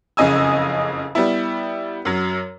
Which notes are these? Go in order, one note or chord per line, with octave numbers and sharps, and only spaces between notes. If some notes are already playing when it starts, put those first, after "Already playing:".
F#1 F2 C#3 D#5 G#5 E6
G3 B3 E4
F#2 F#3